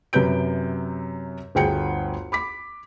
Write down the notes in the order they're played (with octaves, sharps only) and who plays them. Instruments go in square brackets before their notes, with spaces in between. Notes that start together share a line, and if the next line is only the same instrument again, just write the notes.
[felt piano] F#2 C3 B4 G6 D7
G1 D2 G#4 G5 C#7
B5 D6 B6